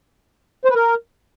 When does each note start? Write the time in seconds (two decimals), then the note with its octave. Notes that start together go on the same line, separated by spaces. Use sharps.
0.65 C5
0.70 B4
0.75 A#4